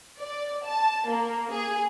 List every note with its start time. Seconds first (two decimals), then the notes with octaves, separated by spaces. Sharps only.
0.21 D5
0.66 A5
1.08 A#3
1.53 G#4